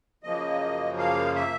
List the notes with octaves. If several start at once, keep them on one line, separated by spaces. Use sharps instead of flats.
F#2 C#3 F3 A#3 D#5
F5
E5